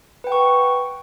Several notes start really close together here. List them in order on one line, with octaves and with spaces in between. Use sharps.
B4 G5 F#5 C#6